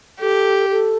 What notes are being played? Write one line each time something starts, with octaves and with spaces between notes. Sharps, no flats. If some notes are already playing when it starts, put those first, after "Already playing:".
G4 A4
A4